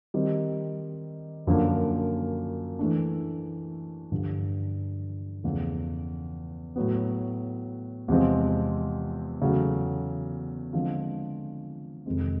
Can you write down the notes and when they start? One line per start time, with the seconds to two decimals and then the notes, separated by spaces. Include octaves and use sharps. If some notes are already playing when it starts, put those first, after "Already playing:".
0.14 D#3 G3 C4
1.47 F#2 D3 F3 A#3 D4
2.79 E3 A3 D4
4.12 G2 D3 F3
5.43 E2 C#3 F3 A3
6.76 A2 F#3 B3
8.08 E2 C3 F3 G#3 C4
9.41 E2 C#3 F#3 A3
10.73 D3 F3 G#3 C4 F4
12.06 F2 C3 D#3 G#3 C4